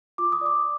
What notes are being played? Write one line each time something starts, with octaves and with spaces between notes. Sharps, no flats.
F4 D6
D#6
D5 D6